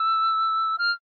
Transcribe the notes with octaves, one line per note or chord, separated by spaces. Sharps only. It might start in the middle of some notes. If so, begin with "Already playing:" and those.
Already playing: E6
F6